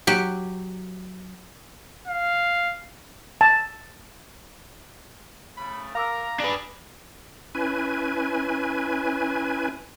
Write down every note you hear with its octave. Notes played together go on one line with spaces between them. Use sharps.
F#3 G4
F5
A5
C#3 A3 B5
A#4 F5 A#5 D6 E6
D4 G#4 B4 D5
C#4 E4 B4 G#5